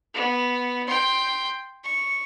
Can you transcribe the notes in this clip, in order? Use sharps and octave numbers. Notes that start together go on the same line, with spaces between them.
B3
G5 C6
C#6